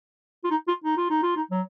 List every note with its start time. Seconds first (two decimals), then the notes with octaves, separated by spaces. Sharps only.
0.44 F4
0.51 D#4
0.68 F4
0.84 D#4
0.97 F4
1.10 D#4
1.23 F4
1.36 D#4
1.51 F#3